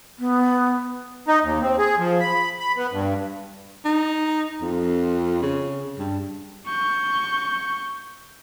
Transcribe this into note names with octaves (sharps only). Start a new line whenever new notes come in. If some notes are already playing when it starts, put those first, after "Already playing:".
B3
D#4
D#2
C4
G#4
F3
B5
B5
B3
G2
D#4
F2
C#3
G2
C#6 G6